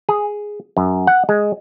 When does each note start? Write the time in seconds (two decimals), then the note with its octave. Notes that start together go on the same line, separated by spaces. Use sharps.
0.09 G#4
0.77 F#2
1.07 F#5
1.29 G#3